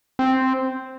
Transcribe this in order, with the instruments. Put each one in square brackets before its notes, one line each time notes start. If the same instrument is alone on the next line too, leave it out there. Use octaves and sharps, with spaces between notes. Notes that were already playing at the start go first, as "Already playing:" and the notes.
[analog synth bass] C4